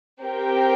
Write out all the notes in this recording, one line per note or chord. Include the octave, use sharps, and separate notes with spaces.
C4 G4 A#4 G5